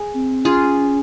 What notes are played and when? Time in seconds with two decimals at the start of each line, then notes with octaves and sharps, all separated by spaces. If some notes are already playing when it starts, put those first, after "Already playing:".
Already playing: G#4
0.14 C4
0.44 C#4 F4 G#4